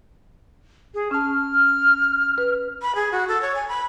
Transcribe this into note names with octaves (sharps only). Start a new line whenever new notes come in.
G#4
C#4 A5 F6
B4
B5
G#4
F#4
A4
C#5
G#5
B5